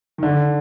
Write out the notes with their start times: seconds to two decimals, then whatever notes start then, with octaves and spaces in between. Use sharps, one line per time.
0.18 D#3
0.23 D3